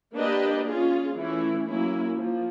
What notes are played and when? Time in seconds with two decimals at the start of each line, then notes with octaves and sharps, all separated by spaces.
0.15 A#3 D4 G4 B4 D#5
0.66 C#4 F4 G#4
1.17 E3 A3 C#4 E4
1.67 F#3 A#3 C#4 E4
2.17 F3 A#3